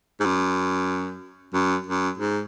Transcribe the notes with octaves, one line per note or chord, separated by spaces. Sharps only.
G#2
F#2
F#2
F#2
G#2